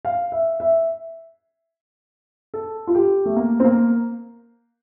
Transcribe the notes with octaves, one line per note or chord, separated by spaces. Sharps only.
F5
E5
E5
A4
F4
G4
A3
A#3
C4
A#3